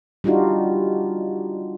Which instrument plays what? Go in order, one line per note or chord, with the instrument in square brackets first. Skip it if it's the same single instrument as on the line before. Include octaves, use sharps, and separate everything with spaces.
[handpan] G3 D4 D#4 F4 F#4